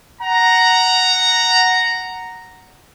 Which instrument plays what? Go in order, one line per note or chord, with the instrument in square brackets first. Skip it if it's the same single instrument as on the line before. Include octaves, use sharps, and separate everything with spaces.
[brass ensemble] F#5 A#5